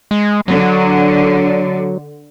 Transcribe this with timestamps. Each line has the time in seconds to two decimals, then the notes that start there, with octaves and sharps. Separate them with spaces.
0.11 G#3
0.48 D3 F#3